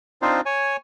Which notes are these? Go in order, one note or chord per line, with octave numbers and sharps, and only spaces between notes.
C4 D4 D#4 F4 C5
C#5 G#5